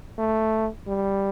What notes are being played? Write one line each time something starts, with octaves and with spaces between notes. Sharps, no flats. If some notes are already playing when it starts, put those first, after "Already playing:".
A3
G3